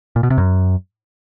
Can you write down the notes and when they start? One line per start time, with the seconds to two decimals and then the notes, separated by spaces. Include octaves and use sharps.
0.16 A#2
0.23 B2
0.30 C3
0.38 F#2